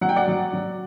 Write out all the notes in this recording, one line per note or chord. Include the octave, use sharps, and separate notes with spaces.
F#3 F#5
G5
D5 F#5
F#3
F#3